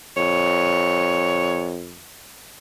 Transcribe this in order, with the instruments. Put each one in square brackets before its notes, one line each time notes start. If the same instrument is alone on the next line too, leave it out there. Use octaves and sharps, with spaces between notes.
[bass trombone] F2 [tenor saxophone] C#5